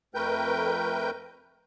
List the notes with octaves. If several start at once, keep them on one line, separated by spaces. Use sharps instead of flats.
F2 A3 A#4 B4 G5 G6